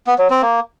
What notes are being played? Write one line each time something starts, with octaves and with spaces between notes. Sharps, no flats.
B3
F#3
C4
A#3